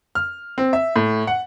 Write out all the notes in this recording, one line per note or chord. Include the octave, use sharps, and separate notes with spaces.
F6
C4
E5
A2
F#5